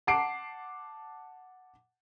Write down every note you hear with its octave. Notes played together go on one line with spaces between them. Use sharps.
F#5 A5 D6 C7 D7